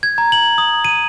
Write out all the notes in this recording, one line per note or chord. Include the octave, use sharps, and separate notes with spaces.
G#6
A#5
F#7
D#6
D#7